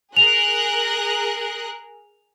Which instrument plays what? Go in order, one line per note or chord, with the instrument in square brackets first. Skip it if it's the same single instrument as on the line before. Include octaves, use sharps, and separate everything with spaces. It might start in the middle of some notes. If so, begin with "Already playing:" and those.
[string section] G#4 A#4 F#6 [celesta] F7